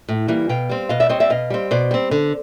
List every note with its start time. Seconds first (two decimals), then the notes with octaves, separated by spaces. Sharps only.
0.09 A2
0.28 E3 G3 A#3
0.49 B2 F5 G5
0.70 G3 C4
0.89 B2 D#5 F5
1.00 D5 E5
1.09 G3 C4 C#5 D#5
1.20 D5 E5
1.30 B2 D#5 F5
1.50 G3 C4
1.71 B2 C5 D5
1.91 G3 C4
2.11 D3